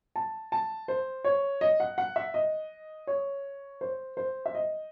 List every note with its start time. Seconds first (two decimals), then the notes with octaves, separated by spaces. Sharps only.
0.16 A5
0.52 A5
0.88 C5
1.24 C#5
1.61 D#5
1.80 F#5
1.98 F#5
2.16 E5
2.34 D#5
3.07 C#5
3.81 C5
4.17 C5
4.46 E5
4.55 D#5